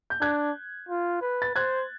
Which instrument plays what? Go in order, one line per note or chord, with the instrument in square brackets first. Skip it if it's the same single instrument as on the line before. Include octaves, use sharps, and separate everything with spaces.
[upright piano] G6
[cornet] D4 [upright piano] F#6 G#6
[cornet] F4
B4
[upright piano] A6
[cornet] C5 [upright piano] F#6 G#6